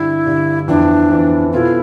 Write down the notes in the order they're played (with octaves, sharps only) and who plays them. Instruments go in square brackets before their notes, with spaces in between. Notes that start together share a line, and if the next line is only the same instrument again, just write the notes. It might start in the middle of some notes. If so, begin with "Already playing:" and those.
Already playing: [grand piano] G2 D3 G3 [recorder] E4
[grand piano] G2 D3 G3
[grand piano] F2 E3 B3 E4 [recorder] D4
[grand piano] F2 E3 B3 E4
[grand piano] B2 B3 F4 A4 [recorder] E4